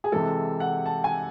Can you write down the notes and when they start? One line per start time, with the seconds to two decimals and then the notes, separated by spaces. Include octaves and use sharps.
0.04 G#4
0.12 C3 E3 G#3 A4
0.60 F#5
0.86 A5
1.04 G#5